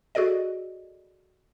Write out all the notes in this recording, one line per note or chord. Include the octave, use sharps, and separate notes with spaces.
F#4 G#4 A4 D5 D#5